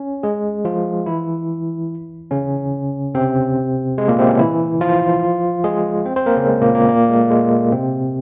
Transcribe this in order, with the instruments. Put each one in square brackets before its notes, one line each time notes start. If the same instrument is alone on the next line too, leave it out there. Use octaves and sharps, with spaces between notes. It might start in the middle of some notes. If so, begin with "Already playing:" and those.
Already playing: [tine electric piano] C#4
G#3 G#4
F3 F4
E3 E4
C#3 C#4
C3 C4
G#3
A#2 A#3
C3 C4
C#3 C#4
E3 E4
F3 F4
G#3 G#4
C4 C5
C4 C5
A#3 A#4
C#3 C#4
G#3
A#2 A#3
A#2 A#3
A#2 A#3
G#3
G#3
C3 C4